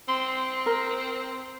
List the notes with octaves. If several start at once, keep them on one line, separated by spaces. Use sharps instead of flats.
C4 C6
A#4